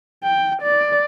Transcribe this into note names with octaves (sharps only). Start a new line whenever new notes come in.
G5
D5